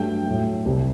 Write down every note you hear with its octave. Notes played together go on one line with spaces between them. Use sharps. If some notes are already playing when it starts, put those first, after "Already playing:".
Already playing: G2 F#3 A3 G5
A2 F#3 A3
C2 C3 G3